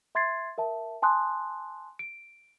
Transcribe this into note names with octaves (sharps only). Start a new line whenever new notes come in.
E5 C6 G#6 A6 C7
A#4 E5 A5
G#5 A5 C6 D#6 F#6
D7